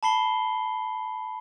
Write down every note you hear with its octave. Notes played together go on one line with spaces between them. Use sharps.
A5 B5 C7 G7